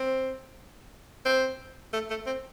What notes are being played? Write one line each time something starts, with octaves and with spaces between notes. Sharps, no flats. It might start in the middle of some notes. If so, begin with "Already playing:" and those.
Already playing: C4
C4
A3
A3
C4